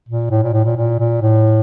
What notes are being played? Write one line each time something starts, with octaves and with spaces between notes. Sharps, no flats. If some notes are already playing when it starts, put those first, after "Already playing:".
A#2
A2
A#2
A2
A#2
A#2
A#2
A2